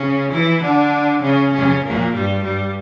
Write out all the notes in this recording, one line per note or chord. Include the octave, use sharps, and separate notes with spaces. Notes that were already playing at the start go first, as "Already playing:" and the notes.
Already playing: C#3 C#4
E3 E4
D3 D4
C#3 C#4
C#3 C#4
A#2 A#3
G2 G3
G2 G3